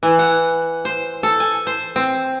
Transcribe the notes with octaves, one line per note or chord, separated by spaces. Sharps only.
E3
F#5
C5
A4
G#5
C5
C4